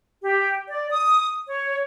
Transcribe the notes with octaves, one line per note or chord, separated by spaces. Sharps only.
G4
D5
D#6
C#5